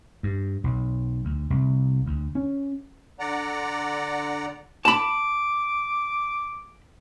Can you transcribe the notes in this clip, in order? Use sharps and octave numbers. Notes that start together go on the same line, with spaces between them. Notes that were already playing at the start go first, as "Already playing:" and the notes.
G2
B1
D2
C2
D2
C#4
D3 D5 F#5 A#5
A5 B5 D6